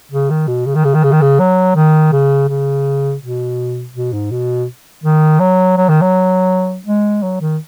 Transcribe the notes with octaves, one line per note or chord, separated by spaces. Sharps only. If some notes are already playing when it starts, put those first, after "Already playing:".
C#3
D#3
B2
C#3
D#3
C#3
D#3
C#3
D#3
C#3
F#3
D#3
C#3
C#3
B2
B2
G#2
B2
D#3
F#3
F#3
D#3
F#3
G#3
F#3
D#3